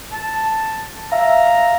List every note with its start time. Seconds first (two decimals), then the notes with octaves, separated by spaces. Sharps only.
0.12 A5
1.12 E5 F5 A#5